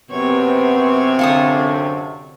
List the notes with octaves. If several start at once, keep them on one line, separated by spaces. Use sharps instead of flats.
F#2 C3 B3 C4 C#5
D3 F4 A4 D#6